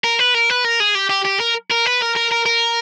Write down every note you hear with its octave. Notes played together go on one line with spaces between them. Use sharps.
A#4
B4
A#4
B4
A#4
G#4
G4
G4
G4
A#4
A#4
B4
A#4
A#4
A#4
A#4